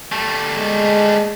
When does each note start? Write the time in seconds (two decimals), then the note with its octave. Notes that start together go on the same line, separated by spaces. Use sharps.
0.12 G3 A3
0.55 G#3